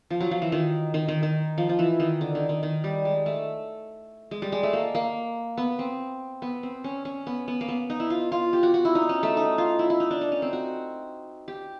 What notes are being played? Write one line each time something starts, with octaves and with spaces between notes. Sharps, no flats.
F3
F#3
F3
E3
D#3
D#3
D#3
D#3
F3
F3
E3
D#3
D3
D#3
D#3
D#3
G3
G#3
A3
G#3
G3
G#3
A3
A#3
A#3
B3
C4
B3
C4
C#4
C#4
B3
B3
A#3
B3
D#4
E4
F4
F4
G4
F#4
F#4
E4
D#4
C#4
A3
D#4
F4
E4
E4
D#4
D4
D#4
C#4
C4
F#4
G4